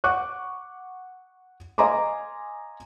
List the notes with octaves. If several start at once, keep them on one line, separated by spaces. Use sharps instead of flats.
F#5 C#6 D6 F#6
D#5 F5 G#5 A#5 C6 D6